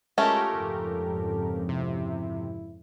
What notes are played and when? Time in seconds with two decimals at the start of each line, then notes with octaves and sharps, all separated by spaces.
0.18 G#3 A3 C#4 F4 G4 A#4
0.51 F2 G#2 C#3 A4
1.69 C3 E4